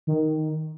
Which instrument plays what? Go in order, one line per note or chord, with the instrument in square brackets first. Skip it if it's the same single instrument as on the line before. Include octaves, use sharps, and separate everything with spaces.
[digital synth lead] D#3